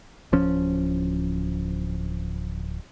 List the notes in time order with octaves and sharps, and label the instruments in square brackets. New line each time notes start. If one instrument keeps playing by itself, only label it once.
[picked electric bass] D1 F3 C#4